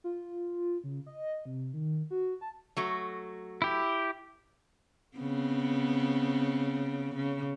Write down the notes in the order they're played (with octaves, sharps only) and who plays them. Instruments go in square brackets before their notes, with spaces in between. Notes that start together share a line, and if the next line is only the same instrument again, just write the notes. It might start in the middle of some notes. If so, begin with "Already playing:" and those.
[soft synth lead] F4
C#3
D#5
C3
D#3
F#4
A5
[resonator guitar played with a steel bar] F#3 A3 F#4
[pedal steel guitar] E4 G4
[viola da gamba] C#3 B3 C4
C#3